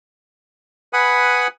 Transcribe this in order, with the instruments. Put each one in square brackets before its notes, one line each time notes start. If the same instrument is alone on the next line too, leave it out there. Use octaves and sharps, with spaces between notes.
[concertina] B4 F#5 G#5 B5 D#6